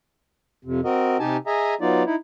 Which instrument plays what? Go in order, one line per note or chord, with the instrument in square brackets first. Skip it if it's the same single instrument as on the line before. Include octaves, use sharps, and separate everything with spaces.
[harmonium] F2 C3
C4 F#4 A#4 D#5
C3 D#4 G4 G#5 A5
G#4 D#5 E5 G#5 A#5
F#3 B3 D#4 F4 D5
D#4 E4